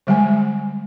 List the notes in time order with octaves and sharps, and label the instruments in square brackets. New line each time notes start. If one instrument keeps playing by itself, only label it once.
[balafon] D3 G3 G#3 G#5